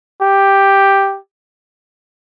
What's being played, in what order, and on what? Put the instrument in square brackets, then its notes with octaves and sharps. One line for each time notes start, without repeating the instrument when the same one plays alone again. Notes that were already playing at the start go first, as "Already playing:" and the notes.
[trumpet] G4